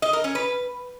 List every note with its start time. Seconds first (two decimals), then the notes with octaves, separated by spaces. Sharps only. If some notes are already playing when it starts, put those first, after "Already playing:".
0.02 D#5
0.13 A#4
0.24 C#4
0.35 B4